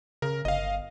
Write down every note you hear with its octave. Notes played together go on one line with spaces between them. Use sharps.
C#3 A#4
G1 D#5 F5